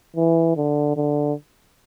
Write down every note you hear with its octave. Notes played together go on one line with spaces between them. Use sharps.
E3
D3
D3